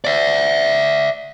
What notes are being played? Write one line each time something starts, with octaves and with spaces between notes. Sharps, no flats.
D5 E5